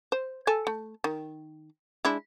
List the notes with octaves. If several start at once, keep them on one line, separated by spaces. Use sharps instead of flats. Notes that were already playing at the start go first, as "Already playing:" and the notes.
C5
A4 G#5
A3
D#3
G#3 D4 E4